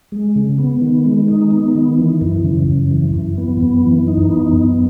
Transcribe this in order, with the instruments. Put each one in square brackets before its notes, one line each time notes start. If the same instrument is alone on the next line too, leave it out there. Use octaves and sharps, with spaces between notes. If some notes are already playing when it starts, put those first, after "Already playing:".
[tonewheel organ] G#3
C#3
B3
D#3
G#3
D#4
B3
D#3
E3
F#2
C#3
F#2
E3
F#2
B3
F#2
E3
D#4
B3
F#2